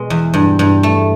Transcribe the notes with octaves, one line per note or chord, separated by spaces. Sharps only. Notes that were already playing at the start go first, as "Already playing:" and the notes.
Already playing: B2 G#3
E2
G2
G2
A3